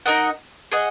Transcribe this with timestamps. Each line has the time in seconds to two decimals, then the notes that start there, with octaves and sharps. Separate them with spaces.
0.06 D#4 A#4 D#5 F#5
0.72 G#4 D#5 F#5